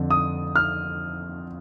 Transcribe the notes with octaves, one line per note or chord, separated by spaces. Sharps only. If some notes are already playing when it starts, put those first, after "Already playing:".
Already playing: F2 D3
D#6
F6